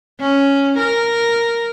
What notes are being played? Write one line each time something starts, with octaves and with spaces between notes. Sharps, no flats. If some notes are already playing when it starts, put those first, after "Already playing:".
C#4
A#4